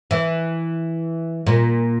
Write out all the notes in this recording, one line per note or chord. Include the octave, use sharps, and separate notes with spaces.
E3
A#2